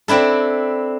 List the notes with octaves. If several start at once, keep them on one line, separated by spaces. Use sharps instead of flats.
C4 D4 E4 A4